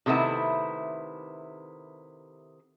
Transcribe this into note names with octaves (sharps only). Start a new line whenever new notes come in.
C3 D#3 A3 B3 E4